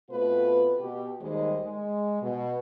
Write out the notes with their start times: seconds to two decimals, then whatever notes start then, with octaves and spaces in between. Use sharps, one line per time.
0.10 B2 A3 C4 F4 B4
0.80 B2 G4
1.21 D#2 D#3 G3 G#3 C5 D#5
1.63 G#3
2.22 B2